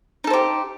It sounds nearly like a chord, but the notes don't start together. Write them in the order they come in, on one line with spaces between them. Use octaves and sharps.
D#4 A4 C5 G4